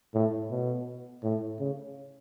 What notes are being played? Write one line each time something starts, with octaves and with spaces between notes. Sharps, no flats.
A2
B2
A2
C#3